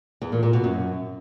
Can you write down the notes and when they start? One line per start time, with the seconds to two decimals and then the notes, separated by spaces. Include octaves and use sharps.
0.22 E2
0.32 A#2
0.43 A#2
0.53 B2
0.64 F#2